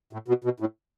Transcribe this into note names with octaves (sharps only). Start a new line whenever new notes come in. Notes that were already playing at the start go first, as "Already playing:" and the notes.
A2
B2
B2
A2